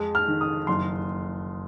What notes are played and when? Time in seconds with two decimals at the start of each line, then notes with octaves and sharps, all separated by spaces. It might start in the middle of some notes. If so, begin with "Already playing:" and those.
Already playing: F2 G#3
0.15 F6
0.28 D#3
0.41 D#6
0.67 F#1 C6